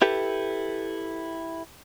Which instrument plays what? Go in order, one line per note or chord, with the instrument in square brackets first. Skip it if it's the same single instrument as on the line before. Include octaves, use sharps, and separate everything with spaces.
[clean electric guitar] E4 G4 A4 B4